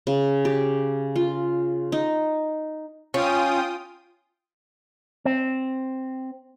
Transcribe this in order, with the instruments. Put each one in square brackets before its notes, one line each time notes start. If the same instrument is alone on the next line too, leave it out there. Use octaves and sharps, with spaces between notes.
[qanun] C#3
G4
F4
D#4
[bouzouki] C#4 [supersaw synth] F4 G5 D#6
[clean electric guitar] C4